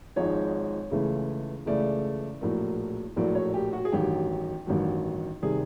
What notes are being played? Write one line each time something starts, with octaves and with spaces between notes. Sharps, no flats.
G#1 G#2 F3 G#3 C#5
C#2 C#3 E3 A3
C#2 C#3 E3 A3 D5
A#1 A2 F#3 A#3
A#1 A2 F#3 A#3 D5
C#5
G4
F#4
G#4
A1 G2 D#3 F#3 G4
A1 G2 D#3 F#3
C3 D#3 G3 G#4